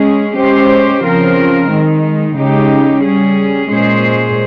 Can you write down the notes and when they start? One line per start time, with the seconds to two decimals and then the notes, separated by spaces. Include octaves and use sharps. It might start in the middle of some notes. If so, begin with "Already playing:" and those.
Already playing: G#3 C#4 G#4
0.36 G#3 C#4 G4 C5
1.02 C#3 F3 C4 F4 A#4
1.69 D#3 G#3 D#4
2.36 C#3 G#3 D#4 G4
3.03 G3 C#4 G#4
3.70 A#2 G#3 C#4 G#4 C5